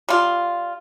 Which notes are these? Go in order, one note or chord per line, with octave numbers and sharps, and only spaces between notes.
G3 F4